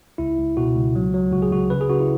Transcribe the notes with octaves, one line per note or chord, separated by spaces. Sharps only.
C#2 E4
C#2
B2 F#4
C#2
F#3
F#3
C#2 F#4
G#4
C#2 F#4
C#3 B4
G#4
C#3 F#4
E4